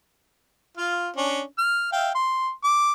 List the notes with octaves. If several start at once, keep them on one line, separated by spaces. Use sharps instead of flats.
F4 F5
C#4 D4
F6
E5 F5 G5
C6
D6